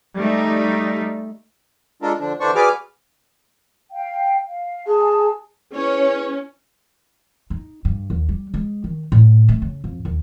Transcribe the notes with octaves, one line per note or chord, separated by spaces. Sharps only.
G3 A3 D#4
G#3 D4 F4 A4 A#4
D3 F3 D4
D3 E3 D4 C5 D5 C#6
F#4 G#4 B4 D5 D6 F6
F5 G5
F5
G#4 G#5 A5
C#4 E4 G#4 B4 C#5
D#4
G2
D#2
G3
G#3
D#3
A2
A3
C#3
F2
D#2